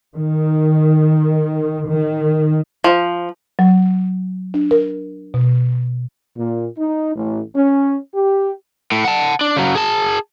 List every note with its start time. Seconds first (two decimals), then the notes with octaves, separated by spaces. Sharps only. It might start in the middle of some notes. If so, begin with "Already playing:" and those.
0.15 D#3
1.90 D#3
2.84 F3
3.59 F#3
4.54 D4
4.71 A#4
5.34 B2
6.37 A#2
6.78 D#4
7.15 A1
7.55 C#4
8.14 G4
8.92 A2
9.05 F#5 A5
9.41 D4
9.57 C#3 F#3
9.75 G#4 A5